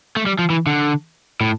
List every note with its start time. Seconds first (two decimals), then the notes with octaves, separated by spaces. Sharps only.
0.16 A3
0.26 G3
0.39 F3
0.50 E3
0.67 D3
1.41 A2